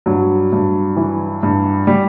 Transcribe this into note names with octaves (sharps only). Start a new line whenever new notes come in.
G2 F#3
G2
E3
G2
G3